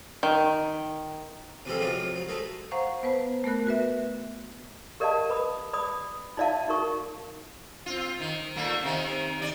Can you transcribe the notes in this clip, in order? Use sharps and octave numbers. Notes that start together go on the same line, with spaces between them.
D#3
C3 E3 F3 G3 G#3 A4
G#2 C3 F3 F#3 F4
F#3
G#3 A3 D#4 A4
C5 F5 F#5 A#5 C#6
B3 B4 C5 A5
A3 B3 A#4 F#6
F#4 B4 E5
G4 A#4 D5 D#5 F5 A5
B4 B5 D#6
D5 B5 D#6
D#4 F4 D5 E5 F5 A5
D#4 F#4 A#4 C#6
C4 F4
D#3
A#2 A3 A#3
C3 D#3
D#3 D5